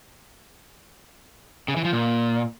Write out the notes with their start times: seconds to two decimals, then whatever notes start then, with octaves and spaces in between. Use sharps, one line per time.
1.68 C#3
1.76 E3
1.85 F3
1.93 A#2